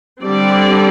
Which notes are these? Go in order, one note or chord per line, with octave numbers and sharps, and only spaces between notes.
D3 G3 C4 D5